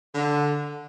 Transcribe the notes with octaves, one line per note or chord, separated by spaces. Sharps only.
D3